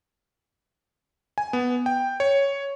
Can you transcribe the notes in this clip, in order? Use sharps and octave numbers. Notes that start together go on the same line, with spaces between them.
G#5
B3
G5
C#5